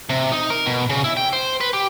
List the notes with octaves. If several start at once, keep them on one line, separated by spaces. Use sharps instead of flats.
C3
D#4
A#4
B2
C#3
E4
G5
C5
B4
G4